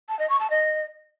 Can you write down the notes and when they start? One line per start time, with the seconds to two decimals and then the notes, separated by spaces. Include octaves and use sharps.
0.09 A5
0.19 D#5
0.30 C#6
0.40 A5
0.50 D#5